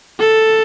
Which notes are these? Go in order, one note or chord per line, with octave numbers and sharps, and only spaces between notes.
A4